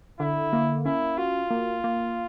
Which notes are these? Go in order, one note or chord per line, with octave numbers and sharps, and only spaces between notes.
D3 E4
A#3
C#4 E4
F4 F#4
A#3
A#3